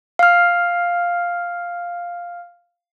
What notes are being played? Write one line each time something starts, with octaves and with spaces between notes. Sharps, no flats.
F5 F6